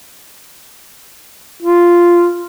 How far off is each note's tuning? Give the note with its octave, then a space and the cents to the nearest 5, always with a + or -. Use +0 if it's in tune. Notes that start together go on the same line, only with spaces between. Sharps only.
F4 -5